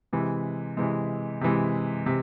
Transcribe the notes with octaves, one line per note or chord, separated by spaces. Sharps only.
C3 E3 G#3
C3 E3 G#3
C3 E3 G#3
C3